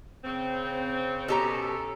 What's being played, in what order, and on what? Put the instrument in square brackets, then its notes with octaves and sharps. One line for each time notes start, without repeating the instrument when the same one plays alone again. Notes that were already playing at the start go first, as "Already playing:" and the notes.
[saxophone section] C#3 C4
[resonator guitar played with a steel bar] B2 G4 A#5 [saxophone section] C#4 A4